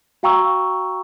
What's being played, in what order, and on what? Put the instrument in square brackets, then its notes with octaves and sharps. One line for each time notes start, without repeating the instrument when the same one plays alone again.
[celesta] F#4 F5 G5 A#5 C#6 E6